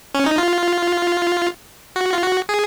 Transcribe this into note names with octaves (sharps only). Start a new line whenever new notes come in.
C#4
D#4
F4
F#4
F4
F#4
G#4